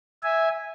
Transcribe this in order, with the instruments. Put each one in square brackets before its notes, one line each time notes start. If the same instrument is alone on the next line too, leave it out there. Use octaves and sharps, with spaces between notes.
[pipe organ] E5 G#5